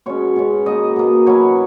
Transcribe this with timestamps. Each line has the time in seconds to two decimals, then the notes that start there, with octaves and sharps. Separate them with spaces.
0.06 B2 G#3 C#4 C#5
0.36 B2 G#3 C#4
0.66 B2 A#3 D#4 D#5
0.96 B2 A#3 D#4
1.26 B2 F#3 C#4 E4 C#5